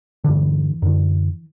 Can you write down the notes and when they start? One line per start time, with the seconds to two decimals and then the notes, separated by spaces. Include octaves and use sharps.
0.24 G2 D3 E3
0.82 F#2 D3